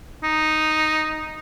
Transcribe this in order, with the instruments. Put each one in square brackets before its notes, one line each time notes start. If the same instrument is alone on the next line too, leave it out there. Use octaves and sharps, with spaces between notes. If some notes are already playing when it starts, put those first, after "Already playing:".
[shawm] D#4